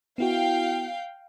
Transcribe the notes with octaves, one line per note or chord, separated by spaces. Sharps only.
B3 E4 F#4 F5 G5